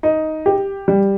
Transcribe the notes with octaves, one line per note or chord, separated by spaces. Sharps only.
D#4
G4
G3